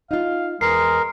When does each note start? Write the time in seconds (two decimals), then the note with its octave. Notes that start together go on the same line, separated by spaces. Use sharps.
0.11 D#4 F4 F5
0.61 E2 G#3 A#4 C7